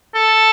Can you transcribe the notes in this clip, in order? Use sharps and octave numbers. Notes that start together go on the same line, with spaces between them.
A4